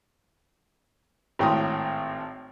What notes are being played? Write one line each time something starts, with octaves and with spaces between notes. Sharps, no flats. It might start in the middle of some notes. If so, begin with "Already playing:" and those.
G#1 A2 G5 A#5 C6 D#6